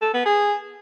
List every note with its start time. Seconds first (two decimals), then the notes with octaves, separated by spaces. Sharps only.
0.02 A4
0.14 B3
0.25 G#4